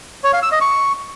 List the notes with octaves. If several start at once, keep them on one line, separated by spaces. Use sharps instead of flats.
C#5
F5
E6
D#5
C#6